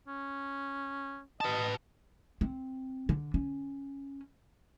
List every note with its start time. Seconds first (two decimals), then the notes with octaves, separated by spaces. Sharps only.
0.08 C#4
1.41 B4 D#5 A5
2.41 C4
3.09 D3
3.34 C#4